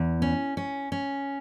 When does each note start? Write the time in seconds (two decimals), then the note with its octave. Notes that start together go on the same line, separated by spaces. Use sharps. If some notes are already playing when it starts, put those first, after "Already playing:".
Already playing: E2
0.22 C#4
0.57 C#4
0.92 C#4